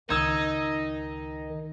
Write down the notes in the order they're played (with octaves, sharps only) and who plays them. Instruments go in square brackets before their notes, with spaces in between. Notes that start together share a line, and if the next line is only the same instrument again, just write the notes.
[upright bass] C#2 [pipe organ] D#3 [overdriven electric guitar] D#4 [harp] E6 G#6